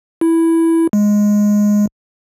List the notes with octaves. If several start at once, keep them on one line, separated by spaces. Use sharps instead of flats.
E4
G#3